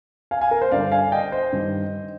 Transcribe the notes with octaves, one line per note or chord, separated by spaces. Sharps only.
F5 G#5
F5 G#5
A#4
C5
G2 D3 G3 D5 F5
F5 G#5
D#5 G5
C5 D#5
G2 D#3 G3